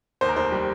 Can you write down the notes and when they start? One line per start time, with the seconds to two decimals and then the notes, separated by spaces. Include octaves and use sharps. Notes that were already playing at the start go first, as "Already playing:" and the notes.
0.21 D#2 C5
0.29 A#4
0.36 F1 C5
0.52 G3